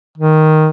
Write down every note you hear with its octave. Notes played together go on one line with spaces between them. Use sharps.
D#3